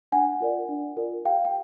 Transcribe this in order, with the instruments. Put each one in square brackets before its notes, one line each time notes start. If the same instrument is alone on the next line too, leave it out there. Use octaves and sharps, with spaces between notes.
[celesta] D4 F#5 G#5
F4 A#4 D5
D4
F4 A#4 D5
G4 F5 G5
G5